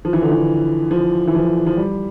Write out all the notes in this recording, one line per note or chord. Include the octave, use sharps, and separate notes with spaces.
F3
E3
D3
E3
F3
E3
F3
F3
G3